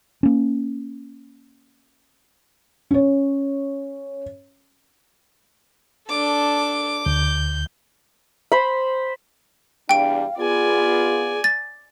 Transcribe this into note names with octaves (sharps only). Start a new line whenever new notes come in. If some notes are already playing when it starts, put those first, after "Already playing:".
A#3 C#4
C#4 C#5
D4 A4 D6
D2 G6
C5 B5
E2 G3 D4 F5 G5 D7
B3 F4 G#4 D5 G#5
A6